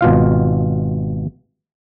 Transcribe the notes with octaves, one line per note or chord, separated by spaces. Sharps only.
G#1 B2 F4 F5